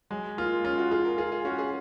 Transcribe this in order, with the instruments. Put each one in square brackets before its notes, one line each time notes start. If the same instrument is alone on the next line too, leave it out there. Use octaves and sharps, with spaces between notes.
[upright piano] F#3 [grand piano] G#3
[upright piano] A#3 [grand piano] F4
[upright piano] C#4 [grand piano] F4
[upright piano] F#4
[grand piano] F4 [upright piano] G#4
[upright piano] A#4
[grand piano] F4 [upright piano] G#4
[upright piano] G#4
[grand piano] C#4 [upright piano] F#4
[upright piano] G#4